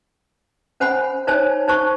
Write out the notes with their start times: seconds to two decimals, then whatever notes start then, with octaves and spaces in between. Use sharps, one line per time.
0.80 C#4 C5 F#5 G#5 B5
1.27 D#4 C5 C#5 G#5 A5
1.68 D#4 C5 A5 C#6